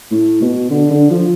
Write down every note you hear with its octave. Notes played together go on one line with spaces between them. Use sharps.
A2
B2
D3
D3
F3